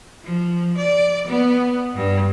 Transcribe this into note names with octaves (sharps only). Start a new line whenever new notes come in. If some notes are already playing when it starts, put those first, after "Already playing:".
F3
D5
B3
G2